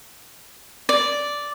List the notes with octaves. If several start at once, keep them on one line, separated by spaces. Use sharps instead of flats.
D5